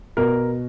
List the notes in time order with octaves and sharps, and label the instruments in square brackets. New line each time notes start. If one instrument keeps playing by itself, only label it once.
[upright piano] B2 A#4